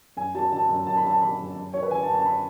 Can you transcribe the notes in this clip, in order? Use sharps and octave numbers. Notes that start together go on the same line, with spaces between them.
F#2 G#5
F#3 A5
D3 A5
F#2
F#2 A5
B5
F#3 A5
D3 B5
F#2
F#2
F#3 C#5
B4
D3 G#5
A5
F#2
A5
B5